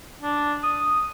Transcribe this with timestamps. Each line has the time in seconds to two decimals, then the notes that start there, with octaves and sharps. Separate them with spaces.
0.22 D4
0.63 D#6